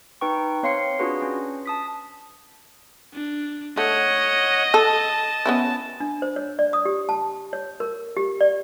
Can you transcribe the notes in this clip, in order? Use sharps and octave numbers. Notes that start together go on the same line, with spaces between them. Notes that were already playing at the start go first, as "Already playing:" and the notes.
D#4 B4 G5 C#6
C4 C#5 F5 C6 C7 C#7
D4 F4 F#4 G#4 B4
C#4
A5 D#6 B6
D4
A3 C#5 D#5 F#5
A4 A5
B3 C#4 E4
D4
C5
C#5
D5
D#6
G4
A5
C#5
A#4
G4
D5